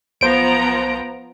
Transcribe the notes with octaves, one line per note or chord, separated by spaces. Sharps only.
B1 F3 B3 C5 A#5 D7